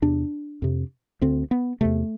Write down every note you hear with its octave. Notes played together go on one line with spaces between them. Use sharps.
E2 C3 D4
F2 C3
D2 D3 C4
B3
E2 C3 A3